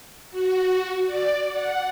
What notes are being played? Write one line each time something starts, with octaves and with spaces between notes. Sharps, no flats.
F#4
D5
F#5